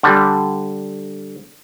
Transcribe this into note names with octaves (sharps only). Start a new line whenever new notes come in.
D3 G3